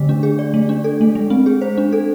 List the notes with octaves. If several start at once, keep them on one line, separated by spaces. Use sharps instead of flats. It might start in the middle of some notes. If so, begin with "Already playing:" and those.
Already playing: D3 A3
D4
G#4
D5
A3
D4
A4
A3
G#3
C4
G#4
C5
D4
A4